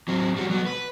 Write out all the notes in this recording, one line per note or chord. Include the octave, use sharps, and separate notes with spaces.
F#3 C4
G3 F#4
F#3 B3
B4